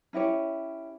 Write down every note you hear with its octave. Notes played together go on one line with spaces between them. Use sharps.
C#4 E4 G4 C#5